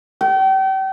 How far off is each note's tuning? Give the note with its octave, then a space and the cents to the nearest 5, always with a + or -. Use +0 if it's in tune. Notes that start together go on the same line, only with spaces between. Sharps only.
G5 -35